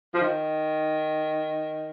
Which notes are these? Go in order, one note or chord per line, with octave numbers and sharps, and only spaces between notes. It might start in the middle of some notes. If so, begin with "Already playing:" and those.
F3
D#3